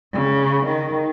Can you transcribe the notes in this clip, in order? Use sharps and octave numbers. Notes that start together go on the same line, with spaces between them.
C#3
D#3